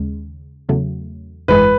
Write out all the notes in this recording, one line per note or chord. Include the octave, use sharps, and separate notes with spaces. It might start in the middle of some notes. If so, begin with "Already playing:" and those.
Already playing: D#2 C#3 G#3
E2 C#3 F#3 A3
G#1 F#2 E3 G#3 B4